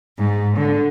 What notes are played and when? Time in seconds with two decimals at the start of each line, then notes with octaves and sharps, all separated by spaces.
0.17 G#2
0.56 D3